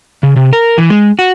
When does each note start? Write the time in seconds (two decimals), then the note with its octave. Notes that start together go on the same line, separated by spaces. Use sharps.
0.23 C#3
0.36 C3
0.53 A#4
0.78 E3
0.90 G#3
1.19 F#4